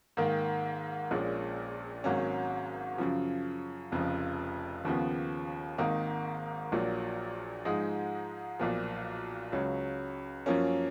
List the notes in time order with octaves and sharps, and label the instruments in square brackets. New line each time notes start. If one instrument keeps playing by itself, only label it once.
[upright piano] G#2 D#3 A#3
A#1 A#2 G#3 C#4
G#1 G#2 F#3 A#3 C#4
F#2 C#3 F3
F1 F2 C#3 F3
D#2 C#3 F3 B3
G#1 G#2 D#3 A#3 D#4
A#1 A#2 F#3
G#2 F3 G#3 D#4
B1 A#2 F3
C#2 C#3 F#3 C#4
F#2 F3 A#3 C#4